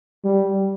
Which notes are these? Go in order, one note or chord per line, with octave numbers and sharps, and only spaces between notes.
G3